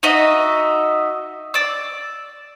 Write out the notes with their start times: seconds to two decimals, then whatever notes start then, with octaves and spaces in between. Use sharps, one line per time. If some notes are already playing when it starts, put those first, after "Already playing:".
0.03 D#4 F#4 D#5 E5
1.54 D5 E6